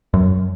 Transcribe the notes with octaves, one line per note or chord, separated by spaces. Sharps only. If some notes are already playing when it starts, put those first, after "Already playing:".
F#2